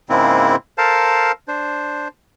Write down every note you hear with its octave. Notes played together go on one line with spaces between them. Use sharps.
G#2 C#3 G#3 A#3 C4 E4
A4 A#4 C5 F5 A5
D4 C5